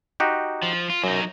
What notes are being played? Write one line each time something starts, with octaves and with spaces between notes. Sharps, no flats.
D#4 F#4 G4
F3
F4
F#2 F#3 D#4